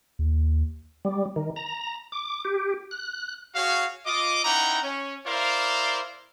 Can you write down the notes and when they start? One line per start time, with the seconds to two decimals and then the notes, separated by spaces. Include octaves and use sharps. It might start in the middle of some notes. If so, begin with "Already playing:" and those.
0.19 D#2
1.05 G3
1.36 D#3
1.56 A#5
2.12 D6
2.45 G4
2.91 F#6
3.55 F#4 G#4 C#5 F5
4.06 F4 D#5 D6
4.44 C#4 D#4 E4 F#5 G5 A#5
4.83 C#4 C#5
5.26 E4 A#4 C5 D5 F5